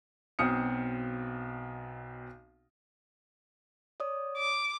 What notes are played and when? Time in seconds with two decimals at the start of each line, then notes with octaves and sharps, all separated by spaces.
0.39 B1 B2 C4 D#6 F6 C#7
4.00 C#5 D5 D#6
4.38 D6